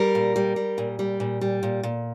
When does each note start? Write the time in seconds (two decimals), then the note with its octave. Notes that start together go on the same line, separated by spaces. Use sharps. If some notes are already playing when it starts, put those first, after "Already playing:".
Already playing: G3 A#4
0.15 A#2
0.36 G3
0.56 G3
0.78 A#2
0.99 G3
1.20 A#2
1.41 G3
1.63 A#2
1.83 A#2